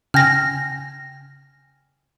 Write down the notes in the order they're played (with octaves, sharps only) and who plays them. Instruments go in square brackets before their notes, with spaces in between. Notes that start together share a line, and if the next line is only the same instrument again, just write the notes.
[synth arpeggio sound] C#3 G5 G#5 [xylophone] F6 A#6